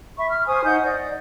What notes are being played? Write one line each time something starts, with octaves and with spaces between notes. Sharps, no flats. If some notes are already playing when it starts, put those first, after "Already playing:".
E5 B5 C#6
F6
C5 G#5 C#6 D#6
D#4 F#5 D#6 G6
D5 D#5